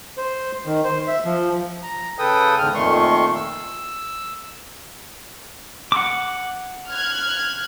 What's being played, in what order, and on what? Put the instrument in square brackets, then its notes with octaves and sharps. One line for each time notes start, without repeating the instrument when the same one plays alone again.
[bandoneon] C5
D#3
C5
E5
F3
[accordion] A#5
C#3 A4 B4 G5 D#6
E2 G#2 D3 F6
F2 A#2 D#3 A3 C6 C#6
E6
[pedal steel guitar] F#5 D6
[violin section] F6 F#6 G#6